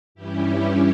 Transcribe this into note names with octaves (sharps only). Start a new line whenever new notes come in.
G2 E3 G3 C#4 E4 G4